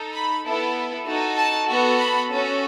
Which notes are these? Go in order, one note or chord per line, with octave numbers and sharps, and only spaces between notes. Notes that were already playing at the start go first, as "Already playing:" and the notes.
Already playing: D#4 A4
B5
B3 E4 A4
D#4 F#4 A4
A5
B3 F#4 A4
B5
C#4 F#4 A4